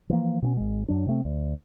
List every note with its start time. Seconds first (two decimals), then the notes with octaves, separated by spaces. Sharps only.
0.10 E3 F3 A#3
0.42 B2 B3 C#4
0.57 G#1 G#3
0.88 F#2 F#3 D4
1.06 C3 A3 C4
1.25 D2